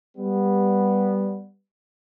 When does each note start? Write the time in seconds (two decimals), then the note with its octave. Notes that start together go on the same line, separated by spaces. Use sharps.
0.18 G3 B3